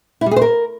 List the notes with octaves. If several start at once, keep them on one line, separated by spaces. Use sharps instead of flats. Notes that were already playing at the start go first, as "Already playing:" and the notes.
E4
G3
G#4
C5
A#4